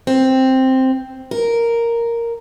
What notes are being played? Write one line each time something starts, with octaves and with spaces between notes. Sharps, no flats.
C4
A#4